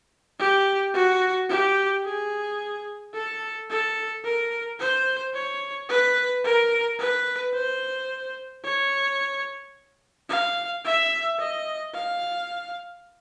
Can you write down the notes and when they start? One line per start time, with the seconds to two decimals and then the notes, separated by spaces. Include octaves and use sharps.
0.39 G4
0.94 F#4
1.49 G4
2.05 G#4
3.14 A4
3.70 A4
4.24 A#4
4.80 C5
5.34 C#5
5.89 B4
6.44 A#4
6.99 B4
7.54 C5
8.64 C#5
10.29 F5
10.85 E5
11.39 D#5
11.94 F5